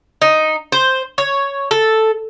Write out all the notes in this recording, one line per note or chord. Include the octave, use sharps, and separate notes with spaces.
D#4
C5
C#5
A4